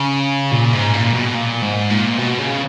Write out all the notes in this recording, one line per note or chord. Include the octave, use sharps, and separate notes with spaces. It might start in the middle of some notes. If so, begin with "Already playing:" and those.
Already playing: C#3
A#2
G#2
A#2
B2
A#2
G#2
A#2
B2
C#3